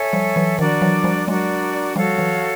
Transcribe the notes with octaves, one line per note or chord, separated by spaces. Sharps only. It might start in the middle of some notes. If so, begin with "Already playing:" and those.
Already playing: A4 C#5 E5 G#5
F3 G3
E3 F#3
D#3 F3 D4 F#4 A#4 D5
E3 F#3
F3 G3
F#3 G#3 D4 F#4 A#4 D5
F3 G3 F#4 A4 C#5 F5
E3 F#3